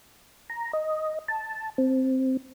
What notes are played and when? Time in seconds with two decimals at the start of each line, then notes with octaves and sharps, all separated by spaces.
0.50 A#5
0.73 D#5
1.28 A5
1.78 C4